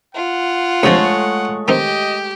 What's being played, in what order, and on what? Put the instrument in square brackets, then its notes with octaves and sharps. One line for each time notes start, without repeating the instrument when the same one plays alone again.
[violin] F4 [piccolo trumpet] F#5
[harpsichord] D2 C3 F3 [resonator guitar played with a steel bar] G#3 A3 C#5
[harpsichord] D#3 C4 D#4 [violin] G4 [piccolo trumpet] D#5